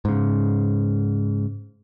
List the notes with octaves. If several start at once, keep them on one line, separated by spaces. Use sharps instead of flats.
G#2 C#3